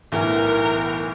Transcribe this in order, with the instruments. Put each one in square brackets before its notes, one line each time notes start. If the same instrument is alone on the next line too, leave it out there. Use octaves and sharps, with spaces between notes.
[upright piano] B1 A2 E3 [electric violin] A#4